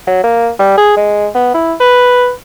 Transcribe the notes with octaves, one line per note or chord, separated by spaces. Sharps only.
F#3
A#3
G3
G#4
G#3
B3
E4
B4